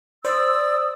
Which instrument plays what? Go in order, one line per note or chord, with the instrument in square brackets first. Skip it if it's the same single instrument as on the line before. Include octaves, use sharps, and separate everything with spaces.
[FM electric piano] C5 [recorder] D5 [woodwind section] D#6 E6